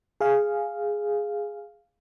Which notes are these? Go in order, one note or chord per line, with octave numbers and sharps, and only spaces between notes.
G#4 F5